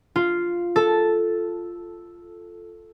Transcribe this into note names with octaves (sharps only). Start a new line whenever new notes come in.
F4
A4